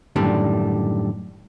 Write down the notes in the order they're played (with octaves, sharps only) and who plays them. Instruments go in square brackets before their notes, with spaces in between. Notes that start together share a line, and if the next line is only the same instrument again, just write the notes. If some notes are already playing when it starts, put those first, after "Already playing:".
[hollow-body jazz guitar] F#2 A2 D3 D#3 G3 D4